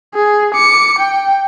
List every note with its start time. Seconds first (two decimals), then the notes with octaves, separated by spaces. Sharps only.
0.14 G#4
0.55 D6 C#7
0.99 G5